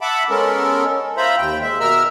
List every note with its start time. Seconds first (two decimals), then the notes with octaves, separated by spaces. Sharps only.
0.01 E5 F#5 A5 B5 D6
0.30 G#3 B3 C#4 A4 A#4
1.17 F4 C5 E5 A#5 B5
1.38 D#2 G5
1.62 G#3 E5
1.80 B2 A#4 E5 A#5 E6 F6